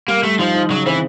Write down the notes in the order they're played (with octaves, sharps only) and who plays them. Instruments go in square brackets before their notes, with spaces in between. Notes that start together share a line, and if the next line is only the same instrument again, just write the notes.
[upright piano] G3 [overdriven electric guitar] A#3
[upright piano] G3 [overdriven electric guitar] A3
[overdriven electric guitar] F3 [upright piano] D#4
[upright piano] D#4
[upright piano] C#3 [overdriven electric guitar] F#3
[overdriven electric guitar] E3 [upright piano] C4